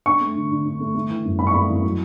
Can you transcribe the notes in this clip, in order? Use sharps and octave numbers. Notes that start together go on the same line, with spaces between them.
D4 C#6
A3
D3
D3
D4
A3
A3
E3
F#2
F#2 B5
C#6
A3 B5
E3
F#3